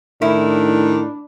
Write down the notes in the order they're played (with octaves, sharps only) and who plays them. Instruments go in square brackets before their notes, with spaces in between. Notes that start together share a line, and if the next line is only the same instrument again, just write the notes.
[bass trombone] A2 [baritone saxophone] D#3 [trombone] D4 [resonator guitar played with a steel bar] E4